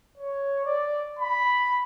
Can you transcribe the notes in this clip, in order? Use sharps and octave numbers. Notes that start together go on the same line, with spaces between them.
C#5
D5
B5